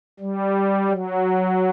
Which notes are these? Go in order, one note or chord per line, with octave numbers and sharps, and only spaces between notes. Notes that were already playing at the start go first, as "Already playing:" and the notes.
G3
F#3